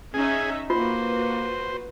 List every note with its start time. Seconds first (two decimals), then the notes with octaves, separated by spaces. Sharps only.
0.14 C#4 D#4 G#4 E5
0.70 A#3 F4 F#4 B4 C5